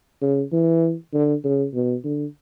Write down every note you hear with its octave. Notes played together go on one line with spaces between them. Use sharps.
C#3
E3
D3
C#3
B2
D3